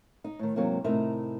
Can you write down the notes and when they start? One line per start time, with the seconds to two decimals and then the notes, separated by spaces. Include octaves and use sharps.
0.24 D#4
0.39 A2 D#3
0.56 G#2 C3 F#3 A#3 C4
0.84 A2 C3 D#4 A#4 E5 A#5